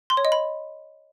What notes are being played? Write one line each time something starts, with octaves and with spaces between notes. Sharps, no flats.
C6
C#5
D#5
B5